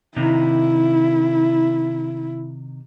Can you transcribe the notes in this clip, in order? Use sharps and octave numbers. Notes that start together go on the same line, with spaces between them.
C3 D#3 E4